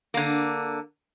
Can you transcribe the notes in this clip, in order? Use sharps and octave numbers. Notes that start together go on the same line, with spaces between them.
D3 A#3